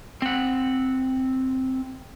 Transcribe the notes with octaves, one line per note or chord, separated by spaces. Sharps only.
C4 F#5